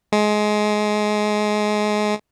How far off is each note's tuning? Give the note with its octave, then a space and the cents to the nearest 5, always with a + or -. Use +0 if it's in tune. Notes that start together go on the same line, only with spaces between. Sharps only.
G#3 +20